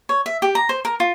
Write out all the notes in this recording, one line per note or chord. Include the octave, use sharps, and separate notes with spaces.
C#5
E5
G4
A#5
C5
A#4
F4